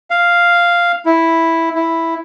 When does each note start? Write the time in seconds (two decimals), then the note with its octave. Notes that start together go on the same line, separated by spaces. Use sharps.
0.10 F5
1.06 E4
1.75 E4